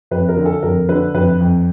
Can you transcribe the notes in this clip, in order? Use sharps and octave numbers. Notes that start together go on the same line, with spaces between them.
F2 B4
A#4
D3
A4
F2 A#4
D3 B4
F2 B4
F2